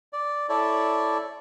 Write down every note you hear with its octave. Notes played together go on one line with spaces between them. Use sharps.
D5
E4 A4 C#5 D5